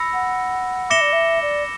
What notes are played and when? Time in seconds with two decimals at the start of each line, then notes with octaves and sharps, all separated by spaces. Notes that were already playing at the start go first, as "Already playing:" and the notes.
Already playing: B5 E6 A#6 C#7
0.13 F#5
0.90 E5 D6 A#6 C#7 E7 G7
1.01 D5
1.12 E5
1.42 D5